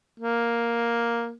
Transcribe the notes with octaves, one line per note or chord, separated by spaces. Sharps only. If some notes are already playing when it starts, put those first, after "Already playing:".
A#3